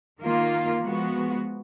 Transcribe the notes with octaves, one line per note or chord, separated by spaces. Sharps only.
D#3 A#3 F4
F3 G#3 B3 F#4